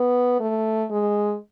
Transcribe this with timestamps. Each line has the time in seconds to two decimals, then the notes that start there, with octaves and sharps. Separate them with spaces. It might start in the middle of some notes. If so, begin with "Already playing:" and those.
Already playing: B3
0.40 A3
0.91 G#3